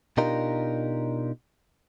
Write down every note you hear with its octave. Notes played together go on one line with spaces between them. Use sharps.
B2 D4 D#4 F4 G4 A#4